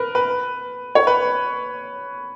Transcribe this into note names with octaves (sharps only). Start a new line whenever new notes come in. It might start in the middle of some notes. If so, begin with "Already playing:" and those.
Already playing: A#4 B4
B4
C#5
B4